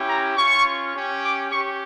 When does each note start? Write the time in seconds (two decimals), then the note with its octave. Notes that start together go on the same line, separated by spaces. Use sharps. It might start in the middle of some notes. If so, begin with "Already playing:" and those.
Already playing: C#4 E4 G4
0.08 A#5
0.36 C#4 F4 C#6
0.94 C#4 G4
1.22 D6
1.50 C#4 G4 C#6